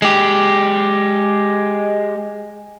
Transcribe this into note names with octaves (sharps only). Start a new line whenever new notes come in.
G#3 G4